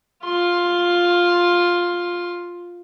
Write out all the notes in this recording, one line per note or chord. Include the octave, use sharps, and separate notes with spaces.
F4 C6